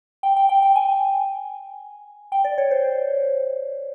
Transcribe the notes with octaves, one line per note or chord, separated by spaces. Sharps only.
G5
G5
G5
G5
G#5
G5
D5
C#5
C5